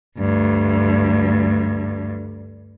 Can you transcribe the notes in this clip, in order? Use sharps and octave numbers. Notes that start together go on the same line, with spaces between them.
D2 G2